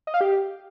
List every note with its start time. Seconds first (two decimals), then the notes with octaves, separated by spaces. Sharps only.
0.07 D#5
0.14 F5
0.21 G4